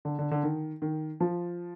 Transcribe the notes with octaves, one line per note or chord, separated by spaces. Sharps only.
D3
D3
D3
D#3
D#3
F3